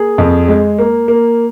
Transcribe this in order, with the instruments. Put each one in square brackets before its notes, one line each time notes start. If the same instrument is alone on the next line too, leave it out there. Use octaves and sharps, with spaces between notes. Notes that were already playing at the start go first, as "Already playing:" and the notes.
Already playing: [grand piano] A#3 G#4
F2
G#3
A#3
A#3